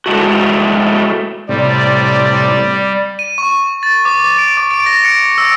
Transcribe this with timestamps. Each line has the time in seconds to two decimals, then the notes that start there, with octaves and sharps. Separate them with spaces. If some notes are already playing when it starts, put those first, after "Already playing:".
0.06 A2 G#3 A3 F#4
1.49 A2 C3 G3 D5
3.19 D#7
3.38 C#6
3.83 A6
4.05 D6
4.38 D7
4.57 D6
4.71 D7
4.86 A#6
5.04 C#7
5.38 E6